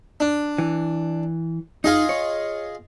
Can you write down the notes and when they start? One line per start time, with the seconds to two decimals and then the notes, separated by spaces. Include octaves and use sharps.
0.20 D4
0.58 E3
1.84 D#4 F4 G#4 D#5
2.09 C#5